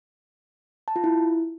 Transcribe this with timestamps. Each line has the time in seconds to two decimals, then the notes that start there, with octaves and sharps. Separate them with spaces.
0.88 A5
0.96 F4
1.04 E4